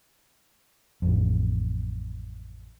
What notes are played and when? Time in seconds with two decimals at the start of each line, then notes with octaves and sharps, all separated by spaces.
1.02 A1 F2